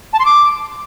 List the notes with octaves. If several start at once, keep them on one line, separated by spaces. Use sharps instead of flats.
A5
C6
D6